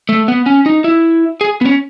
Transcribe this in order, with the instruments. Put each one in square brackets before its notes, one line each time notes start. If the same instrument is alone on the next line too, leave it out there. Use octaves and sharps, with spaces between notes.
[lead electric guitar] A3
B3
C#4
D#4
E4
G#4
B3
C#4